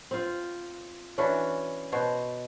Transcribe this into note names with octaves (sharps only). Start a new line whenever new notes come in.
C4 F4
E3 C#4 D4 F#4
B2 F#4 C5 C#5